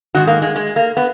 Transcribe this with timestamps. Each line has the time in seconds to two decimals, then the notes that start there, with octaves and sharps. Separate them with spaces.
0.15 G#2 D#3 F#4
0.27 A#3
0.42 G#3
0.56 G#3
0.76 A#3
0.97 B3